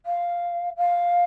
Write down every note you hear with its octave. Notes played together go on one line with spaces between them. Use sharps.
F5
F5